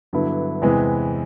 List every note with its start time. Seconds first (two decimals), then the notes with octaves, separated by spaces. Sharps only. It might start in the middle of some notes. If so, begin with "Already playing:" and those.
0.13 G2 D3 F#3 B3 E4
0.62 E2 C3 E3 G#3 B3